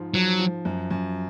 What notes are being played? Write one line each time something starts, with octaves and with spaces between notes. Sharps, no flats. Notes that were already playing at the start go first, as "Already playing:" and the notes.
Already playing: G#2 F3
F3 F#3
F3
F#2
F#2